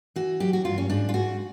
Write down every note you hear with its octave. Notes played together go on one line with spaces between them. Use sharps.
E3 F#4
F#3 G4
F#4
G2 F4
C#4
G#2 D4
F4
G#2 F#4